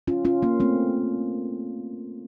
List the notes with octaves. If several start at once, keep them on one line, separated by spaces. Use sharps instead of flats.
C#4 F4
C#4 F4
A#3 C#4
A3 C4